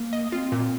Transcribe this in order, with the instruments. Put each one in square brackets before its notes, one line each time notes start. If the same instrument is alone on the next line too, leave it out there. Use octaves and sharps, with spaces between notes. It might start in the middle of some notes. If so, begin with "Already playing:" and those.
Already playing: [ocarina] A#3
[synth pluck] D#5
[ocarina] C4 [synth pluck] F4
[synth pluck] A#2